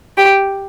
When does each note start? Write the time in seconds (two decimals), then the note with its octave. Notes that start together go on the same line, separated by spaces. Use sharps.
0.17 G4